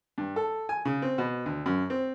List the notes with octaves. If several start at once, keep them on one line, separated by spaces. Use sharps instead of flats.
G2
A4
G#5
C#3
C4
B2
D2
F#2
C4